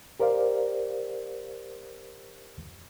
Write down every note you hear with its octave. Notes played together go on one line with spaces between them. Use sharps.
G4 A#4 C5 D5 F5